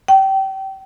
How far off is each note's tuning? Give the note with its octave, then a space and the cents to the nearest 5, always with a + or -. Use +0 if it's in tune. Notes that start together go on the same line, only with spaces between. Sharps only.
G5 -25